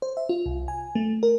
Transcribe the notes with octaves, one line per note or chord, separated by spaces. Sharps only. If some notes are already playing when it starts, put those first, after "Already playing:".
C5
E5
F4
C2
G#5
A3
A#4